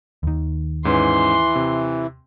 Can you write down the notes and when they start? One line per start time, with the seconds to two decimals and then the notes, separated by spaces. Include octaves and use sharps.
0.23 D#2 D#3
0.85 G#2 E3 C#4 B4 C6
1.55 C3